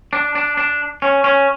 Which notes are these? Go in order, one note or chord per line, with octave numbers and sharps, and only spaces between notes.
D4
D4
D4
C#4
C#4